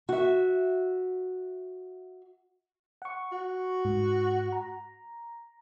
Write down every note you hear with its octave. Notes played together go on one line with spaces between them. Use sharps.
F#4 E5
F#5 C#6
F#4
G#2
A#5